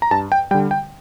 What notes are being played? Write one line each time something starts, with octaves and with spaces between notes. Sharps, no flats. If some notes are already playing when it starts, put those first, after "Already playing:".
A#5
G2 A5
G5
D3 G3 G5
G5